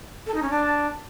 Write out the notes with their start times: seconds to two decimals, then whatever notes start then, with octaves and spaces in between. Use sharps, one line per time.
0.26 A4
0.34 D#4
0.42 C#4
0.50 D4